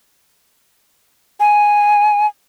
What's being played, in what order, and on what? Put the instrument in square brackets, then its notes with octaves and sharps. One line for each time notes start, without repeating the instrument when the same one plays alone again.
[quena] G#5